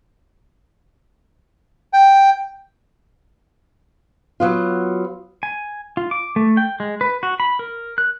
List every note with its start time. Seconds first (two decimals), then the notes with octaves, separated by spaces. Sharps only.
1.93 G5
4.40 F#3 B3 F4
5.43 G#5
5.97 F4
6.11 D6
6.36 A3
6.57 G5
6.80 G#3
7.01 B4
7.23 F#4
7.40 B5
7.59 A#4
7.98 F#6